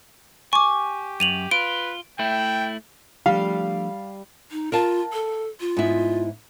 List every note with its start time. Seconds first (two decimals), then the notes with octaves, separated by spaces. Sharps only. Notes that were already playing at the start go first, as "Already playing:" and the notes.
0.53 G4 G#5 C#6 D6
1.20 F#2 D#7 F7 F#7
1.51 F4 B4 D7
2.19 A3 E4 G5
3.26 F3 G3 A3 D4 F5
4.51 D#4
4.72 F4 A#4 F5 A5
5.13 A4
5.60 F4
5.77 G#2 B3 E4